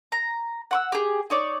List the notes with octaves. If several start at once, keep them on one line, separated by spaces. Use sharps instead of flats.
A#5
F#5 C#6 E6
G4 G#4
D#4 C#5 D5